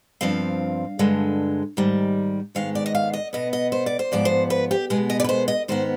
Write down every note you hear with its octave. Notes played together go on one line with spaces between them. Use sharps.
G2 F3 C4 F5
G2 D3 G#3
G#2 D#3 G3
G#2 D#3 G#3 B3 F5
D5
D#5
F5
D#5
B2 B3 D#5
D#5
C5
D5
C5
G#2 F3 B3 D5
C5
B4
G4
B2 G#3 B3 G#4
D#5
D5
B4
C5
D#5
G#2 D#3 B3 C5